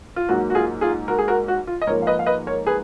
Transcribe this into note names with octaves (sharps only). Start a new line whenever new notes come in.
F4
G#2 F#3 A#3 F#4
F#4
F4 G#4
F4 G#4
F#4 A#4
G#4
F#4 A#4
F#4
F4
D#5
G#2 F3 A#3 A#4 C#5
F5
B4 D#5
F5
B4 D#5
A#4 C#5
G#4 B4